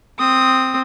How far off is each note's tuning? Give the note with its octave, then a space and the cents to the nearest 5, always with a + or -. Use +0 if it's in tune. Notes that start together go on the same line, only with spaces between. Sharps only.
C4 +0 D#6 +0